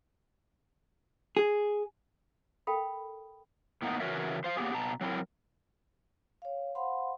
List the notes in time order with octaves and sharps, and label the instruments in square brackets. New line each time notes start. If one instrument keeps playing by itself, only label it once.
[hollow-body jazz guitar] G#4
[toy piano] A4 A#4 F5 G5 B5 D#6
[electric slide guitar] A2 A#3 B3 D#4
C#3 E3 F#4 A#4 C#5 E5
C5 F5
A#3 B3 G4 G#4
B2 A5 A#5
F#3 C4 E4 A#4
[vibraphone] C#5 F5
C5 F5 F#5 B5 C6